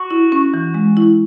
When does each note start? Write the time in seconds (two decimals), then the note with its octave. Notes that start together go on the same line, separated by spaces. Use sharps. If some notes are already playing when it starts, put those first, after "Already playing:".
Already playing: F#4
0.11 E4
0.32 C#4
0.54 E3
0.74 G#3
0.97 E4